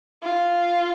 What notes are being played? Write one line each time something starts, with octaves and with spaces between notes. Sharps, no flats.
F4